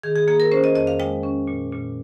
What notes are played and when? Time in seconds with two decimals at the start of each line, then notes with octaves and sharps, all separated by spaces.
0.03 D#3 G#4
0.16 G#4
0.28 A#3 G#4
0.40 A#4
0.51 C#4 C5
0.64 D#5
0.75 F2 D#5
0.87 F5
0.99 G#3 G5
1.23 C#4
1.48 A#2
1.72 A#2